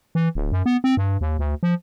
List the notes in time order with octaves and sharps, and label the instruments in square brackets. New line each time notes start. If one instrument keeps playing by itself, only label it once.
[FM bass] E3
D1
F#2
B3
C4
G2
D#2
D2
F3